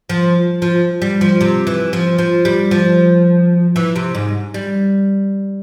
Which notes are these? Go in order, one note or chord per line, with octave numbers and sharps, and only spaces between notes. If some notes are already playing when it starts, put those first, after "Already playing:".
F3
F3
G3
F3
C3
E3
F3
F3
G3
F3
E3
C3
G#2
G3